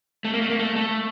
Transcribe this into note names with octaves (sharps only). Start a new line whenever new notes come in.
A3
A#3
A3
A#3
A3
A3